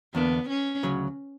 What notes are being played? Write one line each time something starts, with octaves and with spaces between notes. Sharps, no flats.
E2 D3 A#3 B3 D4
C#4
D2 C#3 F#3